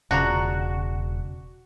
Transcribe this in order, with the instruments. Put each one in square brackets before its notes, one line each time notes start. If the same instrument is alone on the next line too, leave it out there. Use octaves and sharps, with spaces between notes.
[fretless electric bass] E1 C#3 [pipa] D4 F4 A#5 [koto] F#4